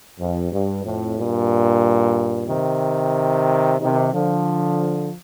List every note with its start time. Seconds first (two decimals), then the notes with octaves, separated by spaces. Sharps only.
0.19 F2
0.52 G2
0.85 F2 A2
1.18 G2 A#2
2.49 C3 D#3
3.81 C3 D#3
4.13 D3 F3